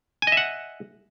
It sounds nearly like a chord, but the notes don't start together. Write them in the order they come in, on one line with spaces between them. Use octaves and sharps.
G#5 D#5 E5 F#5